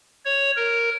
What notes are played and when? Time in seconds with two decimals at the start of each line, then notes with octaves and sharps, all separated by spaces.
0.25 C#5
0.56 A#4